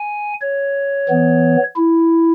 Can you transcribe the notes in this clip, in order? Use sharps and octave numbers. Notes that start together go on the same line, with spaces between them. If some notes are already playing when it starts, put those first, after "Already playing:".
Already playing: G#5
C#5
E3 B3
E4